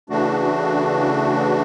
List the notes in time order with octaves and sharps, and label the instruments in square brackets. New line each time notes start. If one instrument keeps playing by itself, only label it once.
[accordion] C#3 E3 A3 D4 F#4